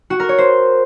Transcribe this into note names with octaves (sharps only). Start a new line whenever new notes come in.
F#4
A#4
C#5
C5